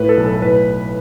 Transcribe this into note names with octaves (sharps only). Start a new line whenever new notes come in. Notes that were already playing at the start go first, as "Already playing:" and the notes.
Already playing: A2 B4
A4
B1
A4
A2 B4